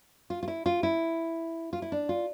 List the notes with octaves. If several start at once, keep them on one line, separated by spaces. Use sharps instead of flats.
F4
F4
E4
F4
E4
F4
E4
D4
F4